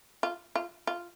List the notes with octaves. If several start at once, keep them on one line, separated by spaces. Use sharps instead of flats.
F4
F4
F4